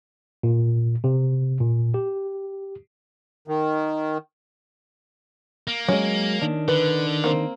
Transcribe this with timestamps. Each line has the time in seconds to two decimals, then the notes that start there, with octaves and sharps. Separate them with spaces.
0.43 A#2
1.04 C3
1.60 A#2
1.94 G4
3.48 D#3
5.67 A#3
5.89 F#3 G#3 C#4
6.42 D#3 D4
6.68 D3 B4
7.24 A#3 C4